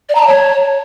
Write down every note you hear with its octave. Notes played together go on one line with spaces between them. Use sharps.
D5
A#5
A5
C#5